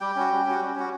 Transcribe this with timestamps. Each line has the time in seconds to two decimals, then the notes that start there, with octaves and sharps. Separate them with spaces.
0.01 G3 G4 G5
0.16 C#4 F#4
0.32 G3
0.46 C#4 F#4
0.61 G3
0.75 C#4 F#4